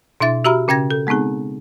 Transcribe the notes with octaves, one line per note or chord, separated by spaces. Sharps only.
B2 D4 E4 E5 A6
F#4 G4 E5 A#5 B5 F6
C#3 C#4 G5 G#6 A#6
A4
G#3 B3 C4 D#4 G#4